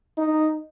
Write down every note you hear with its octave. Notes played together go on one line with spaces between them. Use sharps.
D#4